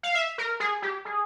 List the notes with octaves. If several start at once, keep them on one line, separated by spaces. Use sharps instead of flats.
F5
E5
A#4
G#4
G4
G#4